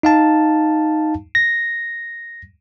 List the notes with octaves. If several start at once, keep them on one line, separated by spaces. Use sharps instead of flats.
D#4 F5 A5
A#6